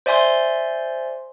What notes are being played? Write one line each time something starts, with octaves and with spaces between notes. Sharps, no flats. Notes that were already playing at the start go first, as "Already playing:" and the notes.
C5 D5 E5 G#5 C6 G6